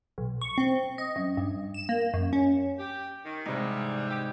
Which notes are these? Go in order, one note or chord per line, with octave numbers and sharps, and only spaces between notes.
B1
C#6
C4
D#5
F#2
G2
E7
A#3
F#2
C#4
G4
D#3
G#2 C3 E3 G3 D#4
G4